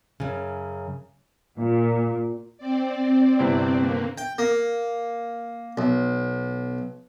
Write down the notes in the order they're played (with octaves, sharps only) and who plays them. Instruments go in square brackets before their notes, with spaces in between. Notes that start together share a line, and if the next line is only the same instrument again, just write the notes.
[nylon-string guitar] F#2 C#3
[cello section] A#2
[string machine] C4 D5
[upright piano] G1 C3 E4
[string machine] D3 A#3
[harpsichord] G5
A#3
B1